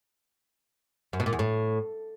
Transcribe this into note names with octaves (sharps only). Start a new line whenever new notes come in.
F#2
B2
A#2
E2
A2